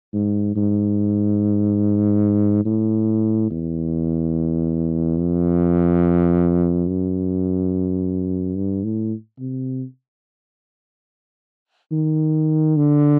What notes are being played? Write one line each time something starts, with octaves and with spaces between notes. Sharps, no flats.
G#2
G#2
A2
E2
F2
F#2
G2
A2
C3
D#3
D3